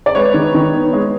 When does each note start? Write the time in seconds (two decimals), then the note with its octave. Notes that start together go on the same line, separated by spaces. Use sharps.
0.06 D5
0.15 G#3 B4 C#5
0.34 D#3
0.55 D#3
0.74 B3
0.93 G#3